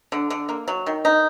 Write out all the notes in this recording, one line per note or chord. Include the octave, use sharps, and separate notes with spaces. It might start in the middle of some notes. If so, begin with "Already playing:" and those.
D3
D3
A#3
F#3
D#3
D#4